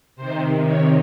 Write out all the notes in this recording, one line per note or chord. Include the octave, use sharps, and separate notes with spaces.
C3 D#3 C5
C#5